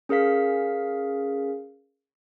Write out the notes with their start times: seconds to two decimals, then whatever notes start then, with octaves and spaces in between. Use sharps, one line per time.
0.09 C#4 G#4 A#4 F5 B6